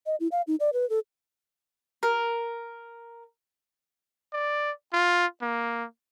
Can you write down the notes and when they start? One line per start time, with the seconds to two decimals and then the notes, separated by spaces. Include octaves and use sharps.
0.06 D#5
0.20 E4
0.32 F5
0.47 D#4
0.60 D5
0.73 B4
0.90 A4
2.03 A#4
4.33 D5
4.93 F4
5.42 A#3